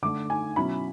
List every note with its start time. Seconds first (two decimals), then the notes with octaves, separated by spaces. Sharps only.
0.02 D3 A3 D4 D6
0.30 G#5
0.56 B2 F#3 C#4 E4 B5